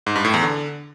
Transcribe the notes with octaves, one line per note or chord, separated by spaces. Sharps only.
G#2
G2
A2
E2
D3